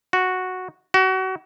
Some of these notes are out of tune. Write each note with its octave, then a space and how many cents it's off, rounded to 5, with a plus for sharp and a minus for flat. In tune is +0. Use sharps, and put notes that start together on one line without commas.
F#4 -5
F#4 +30